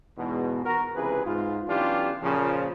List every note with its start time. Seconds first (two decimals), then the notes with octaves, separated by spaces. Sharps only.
0.18 E2 G#2 B2
0.65 F#4 A#4
0.95 C#2 C3 E3 G#4 B4
1.25 G#2 F4
1.68 B1 E3 C#4 D4 F4 G4
2.22 A#2 C#3 F3